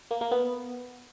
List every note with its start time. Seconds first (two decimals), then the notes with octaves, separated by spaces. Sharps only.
0.11 A#3
0.21 A#3
0.31 B3